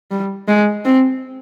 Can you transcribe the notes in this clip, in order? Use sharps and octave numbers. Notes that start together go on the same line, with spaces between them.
G3
G#3
C4